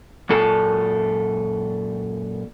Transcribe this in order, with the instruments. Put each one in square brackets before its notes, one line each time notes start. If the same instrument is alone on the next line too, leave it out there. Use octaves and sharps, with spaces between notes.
[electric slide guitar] F#2 A#2 A4 A5